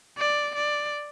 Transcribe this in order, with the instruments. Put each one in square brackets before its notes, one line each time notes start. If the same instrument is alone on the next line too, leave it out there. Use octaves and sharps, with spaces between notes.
[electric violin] D5
D5